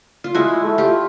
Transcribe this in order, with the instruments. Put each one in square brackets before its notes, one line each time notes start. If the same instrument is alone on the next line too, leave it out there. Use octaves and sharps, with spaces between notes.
[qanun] F4
[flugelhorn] G#3 [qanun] E4 F#4
[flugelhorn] A3
[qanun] F4 G4